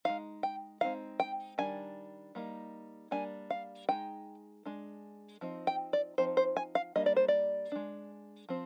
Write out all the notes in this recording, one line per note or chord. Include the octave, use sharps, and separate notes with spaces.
G#3 D#4 F5
G5
G#3 C4 D#4 F5
G5
D#3 G3 D4 G#5
G3 A#3 D#4
G3 A#3 D4 G#5
F5
G#3 D#4 G5
G#3 D4
F3 C4 D#4
G5
D5
F3 C4 D#4 C5
C5
G#5
F5
G3 A#3 D4 D#5
D5
C5
D5
G#3 D4
F3 C4